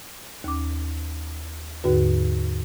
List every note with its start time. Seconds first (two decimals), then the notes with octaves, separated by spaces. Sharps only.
0.44 D#2 C#4 D6
1.84 D#2 G#2 D3 F#4 B4